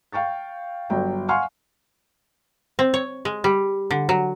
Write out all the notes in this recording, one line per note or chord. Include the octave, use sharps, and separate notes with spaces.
F5 G5 C#6 A6
G1 F#3 G5
F5 F#5 G#5 C6 C#6 F6
C4
C#5
G#3
G3
D3
F#3